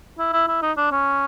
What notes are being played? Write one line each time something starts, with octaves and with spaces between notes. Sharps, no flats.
E4
E4
E4
D#4
D4
C#4